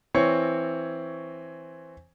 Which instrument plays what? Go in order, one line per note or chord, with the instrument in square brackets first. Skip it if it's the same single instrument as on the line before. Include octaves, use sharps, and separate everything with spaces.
[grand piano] E3 C4 C#5 C#6